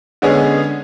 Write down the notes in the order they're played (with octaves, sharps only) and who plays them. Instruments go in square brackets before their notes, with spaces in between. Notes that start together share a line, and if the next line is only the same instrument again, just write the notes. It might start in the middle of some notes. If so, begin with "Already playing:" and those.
[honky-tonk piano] D3 G#3 B3 C#4 G#4